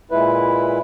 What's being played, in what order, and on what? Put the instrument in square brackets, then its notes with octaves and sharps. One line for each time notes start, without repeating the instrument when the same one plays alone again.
[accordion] A#2 G#3 E4 B4